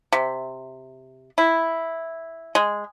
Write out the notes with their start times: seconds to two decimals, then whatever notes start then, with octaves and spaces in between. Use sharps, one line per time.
0.12 C3
1.38 E4
2.55 G#3